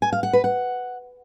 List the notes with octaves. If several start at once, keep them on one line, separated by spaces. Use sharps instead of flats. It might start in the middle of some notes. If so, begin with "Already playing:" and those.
G#5
F5
F#5
B4
F#5